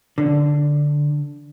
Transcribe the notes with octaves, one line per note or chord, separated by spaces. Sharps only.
D3